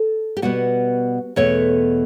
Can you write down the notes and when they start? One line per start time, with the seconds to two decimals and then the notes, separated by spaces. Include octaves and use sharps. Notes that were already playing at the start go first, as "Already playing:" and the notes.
Already playing: A4
0.37 G4
0.42 B2 G3 B3 F#4
1.36 E2 B2 A3 C#5